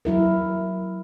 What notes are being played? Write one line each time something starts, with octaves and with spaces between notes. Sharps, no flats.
F#3 E4 A#4